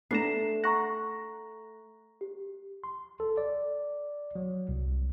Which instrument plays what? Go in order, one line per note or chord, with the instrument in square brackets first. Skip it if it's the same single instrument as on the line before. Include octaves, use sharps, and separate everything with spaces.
[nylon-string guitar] A3 [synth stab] B3 D4 A#5 [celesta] C7 E7
[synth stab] F#5 [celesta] A#5 C#6 A#6
[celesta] G4
[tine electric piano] C6
A4
D5
F#3
C2